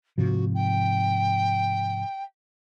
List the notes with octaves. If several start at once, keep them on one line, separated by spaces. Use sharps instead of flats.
G#2 C3 F3 F#4
G5